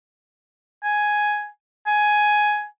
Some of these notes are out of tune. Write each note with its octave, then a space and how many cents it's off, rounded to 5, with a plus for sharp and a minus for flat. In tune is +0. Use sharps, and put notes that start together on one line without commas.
G#5 +5
G#5 +10